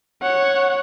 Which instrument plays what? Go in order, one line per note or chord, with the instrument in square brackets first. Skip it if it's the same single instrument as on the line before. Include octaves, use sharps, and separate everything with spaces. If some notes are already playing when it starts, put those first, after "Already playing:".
[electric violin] C#5 F#5